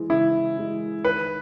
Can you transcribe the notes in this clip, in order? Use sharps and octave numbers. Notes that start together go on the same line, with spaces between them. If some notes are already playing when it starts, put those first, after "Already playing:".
Already playing: E3 G#3
C#3 E4
E3 G#3
D#3 B4